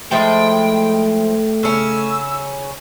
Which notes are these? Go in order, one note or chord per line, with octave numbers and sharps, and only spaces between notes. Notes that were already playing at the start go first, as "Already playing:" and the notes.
F3 G#3 A3 E4 G5
C#3 C#4 E6